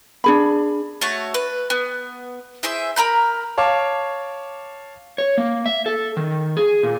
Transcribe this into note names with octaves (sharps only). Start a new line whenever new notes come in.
D4 G#4 B5
A3 F#4 C#5 A5
B4
B3
E4 G#4 C5 E5
A#4 A#5 B5 G6
C#5 F5 A5 D6
C#5
A#3
E5
A4
D#3
G#4
A#2